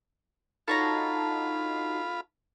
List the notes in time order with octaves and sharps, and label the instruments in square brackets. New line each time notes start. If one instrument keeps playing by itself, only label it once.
[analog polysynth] D#4 F#4 C7 [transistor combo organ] F4 B5 [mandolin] A4 C#5 A#5